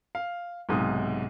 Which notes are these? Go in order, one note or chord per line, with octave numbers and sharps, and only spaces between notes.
F5
B1 G#2 C3 D#6